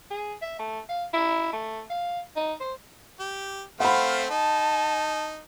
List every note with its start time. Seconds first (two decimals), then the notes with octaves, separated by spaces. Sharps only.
0.11 G#4
0.42 E5
0.59 A3
0.89 F5
1.14 E4
1.53 A3
1.90 F5
2.36 D#4
2.61 C5
3.20 G4
3.80 A3 C4 C5 F5 F#5 B5
4.30 D#4 A5